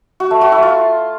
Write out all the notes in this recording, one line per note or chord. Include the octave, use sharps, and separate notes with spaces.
F#4
A3
F#4
E4
F4